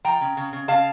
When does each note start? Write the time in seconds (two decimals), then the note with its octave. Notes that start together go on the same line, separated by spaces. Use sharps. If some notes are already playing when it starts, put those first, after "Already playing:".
0.04 F3 G5 A#5
0.21 C#3
0.37 C#3
0.53 C#3
0.68 C#3 F5 A5